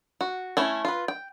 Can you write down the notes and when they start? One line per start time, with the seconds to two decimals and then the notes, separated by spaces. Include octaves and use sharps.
0.21 F#4
0.57 A3 C#4 E4
0.85 F4 B4
1.08 G5